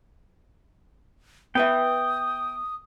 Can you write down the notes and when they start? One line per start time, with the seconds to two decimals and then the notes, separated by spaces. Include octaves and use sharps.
1.55 B3 B4 E5 G5 D#6